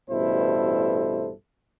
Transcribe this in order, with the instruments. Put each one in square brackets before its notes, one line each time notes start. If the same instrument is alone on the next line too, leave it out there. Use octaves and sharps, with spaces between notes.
[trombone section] A1 G2 B2 E4 A4 C5